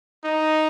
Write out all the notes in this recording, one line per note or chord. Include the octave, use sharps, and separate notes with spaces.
D#4